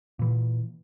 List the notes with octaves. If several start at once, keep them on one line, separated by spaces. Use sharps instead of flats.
A#2 E3